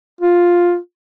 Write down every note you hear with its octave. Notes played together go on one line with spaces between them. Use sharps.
F4